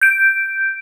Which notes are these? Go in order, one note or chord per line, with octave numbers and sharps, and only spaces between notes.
G6 D7